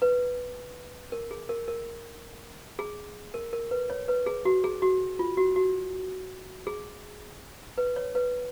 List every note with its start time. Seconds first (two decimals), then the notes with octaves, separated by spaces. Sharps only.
0.02 B4
1.12 A#4
1.31 G#4
1.49 A#4
1.68 A#4
2.79 G#4
3.34 A#4
3.53 A#4
3.71 B4
3.90 C#5
4.08 B4
4.26 G#4
4.45 F#4
4.64 G#4
4.82 F#4
5.19 F4
5.37 F#4
5.56 F#4
6.67 G#4
7.78 B4
7.96 C#5
8.15 B4